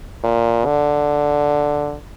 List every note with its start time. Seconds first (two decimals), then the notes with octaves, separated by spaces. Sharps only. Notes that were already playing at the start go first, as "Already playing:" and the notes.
0.24 A#2
0.66 D3